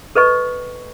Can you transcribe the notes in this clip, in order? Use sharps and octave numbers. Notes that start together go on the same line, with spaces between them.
A4 B4 D#5 C#6